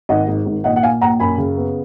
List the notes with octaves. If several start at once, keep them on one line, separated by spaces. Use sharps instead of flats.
G#1 D#5 F#5
G#2
G#1
A#1 D#5 F#5
F#5
A#2 F5 G#5
A#1 F#5 A#5
F#2 G#5 B5
C#3
B3